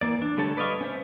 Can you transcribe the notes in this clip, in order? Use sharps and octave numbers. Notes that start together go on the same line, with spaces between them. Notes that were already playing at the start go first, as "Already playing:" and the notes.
E3 A#3 D5
D4
D3 G3 A3 C#5 A5
B4 D5 D#5 F5 C#6
C#4 C5 E5